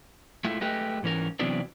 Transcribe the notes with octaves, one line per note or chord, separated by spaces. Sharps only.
G#3 A3 E4 F4
G#3 A3 G4 B4 D#5
G#2 E3 C#4 A#4
C3 E3 F#3 B3 C4 D4